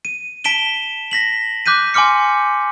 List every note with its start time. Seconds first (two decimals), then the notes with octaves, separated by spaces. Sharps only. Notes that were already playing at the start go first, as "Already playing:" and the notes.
0.05 D#7
0.44 A5 B6 D7 E7 G7
1.11 A#6 B6 F#7
1.66 D6 F#6 G6 B6 D#7
1.94 G#5 C6 D6 F6 C#7